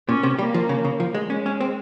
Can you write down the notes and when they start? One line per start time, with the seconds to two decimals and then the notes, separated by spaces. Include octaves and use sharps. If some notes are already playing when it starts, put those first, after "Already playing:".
0.09 A#2 C#4
0.23 C3
0.38 G3 A#3
0.54 F3
0.69 C#3
0.84 C#3
1.00 F3
1.14 G#3
1.30 G#3 C#4
1.46 C#4
1.60 C4